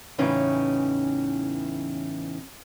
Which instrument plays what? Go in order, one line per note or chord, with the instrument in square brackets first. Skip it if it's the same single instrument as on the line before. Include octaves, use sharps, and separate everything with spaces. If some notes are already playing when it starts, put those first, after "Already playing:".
[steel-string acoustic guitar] E2 A2 C#3 E3 C#4 D#4